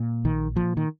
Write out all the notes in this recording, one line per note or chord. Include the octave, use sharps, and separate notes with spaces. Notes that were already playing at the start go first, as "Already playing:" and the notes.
Already playing: A#2
A#1 D#3
A#2 F3
D#3